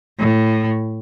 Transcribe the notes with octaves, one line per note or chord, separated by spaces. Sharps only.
A2